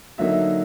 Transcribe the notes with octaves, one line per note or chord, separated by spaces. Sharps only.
D3 F#3 A#3 D#4 E5